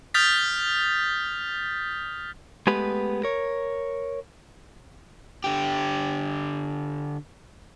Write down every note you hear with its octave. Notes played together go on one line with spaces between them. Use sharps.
D#6 F6 G6 A6 B6
G#3 A3 B3 G4 B4
A#4 C#5
D3 G4